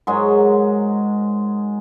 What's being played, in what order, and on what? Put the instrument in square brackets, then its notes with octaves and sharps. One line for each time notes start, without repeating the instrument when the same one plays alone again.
[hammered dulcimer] G#2 F#3 G#3 A#4